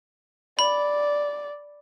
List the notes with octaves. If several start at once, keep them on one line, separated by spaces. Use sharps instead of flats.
D5 B5